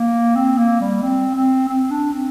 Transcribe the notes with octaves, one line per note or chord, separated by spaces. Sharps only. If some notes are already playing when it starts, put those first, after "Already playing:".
Already playing: A#3
C4
A#3
G3
C4
C4
C4
D4
C4